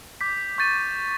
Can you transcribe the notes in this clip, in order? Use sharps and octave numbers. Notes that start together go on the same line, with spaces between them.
D6 G6 B6
C#6 G6 A6 D#7